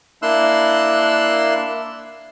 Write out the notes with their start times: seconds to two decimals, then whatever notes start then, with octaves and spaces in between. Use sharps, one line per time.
0.22 A#3 D4 E4 C6 E6 F#6